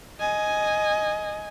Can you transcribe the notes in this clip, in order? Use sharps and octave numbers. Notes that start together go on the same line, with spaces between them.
D#5 G#5